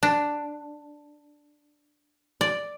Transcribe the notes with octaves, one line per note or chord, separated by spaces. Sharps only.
D4
D5